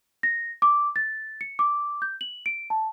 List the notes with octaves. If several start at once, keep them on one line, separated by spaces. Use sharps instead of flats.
A#6
D6
A6
C#7
D6
G6
F#7
D7
A5